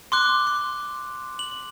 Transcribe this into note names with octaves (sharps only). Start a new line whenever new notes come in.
C6 D6 F#6
C6
F#7